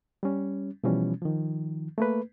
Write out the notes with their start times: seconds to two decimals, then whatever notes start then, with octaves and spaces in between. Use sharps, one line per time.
0.23 G3 C#4
0.84 B2 E3 F3 G3 C#4
1.22 D#3 F3
1.98 A3 A#3 B4